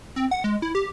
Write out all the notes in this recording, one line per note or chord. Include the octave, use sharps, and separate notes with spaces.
C4
F#5
G#3
E4
G4